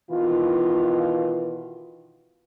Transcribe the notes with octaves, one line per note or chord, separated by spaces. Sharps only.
B2 D#3 E3 F4